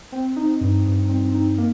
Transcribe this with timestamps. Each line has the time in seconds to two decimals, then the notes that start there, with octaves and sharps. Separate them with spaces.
0.12 C4
0.36 D#4
0.61 G2
0.86 G2
1.09 C4
1.34 D#4
1.58 A#3